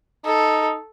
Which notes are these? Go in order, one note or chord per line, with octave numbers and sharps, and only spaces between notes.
D#4 A4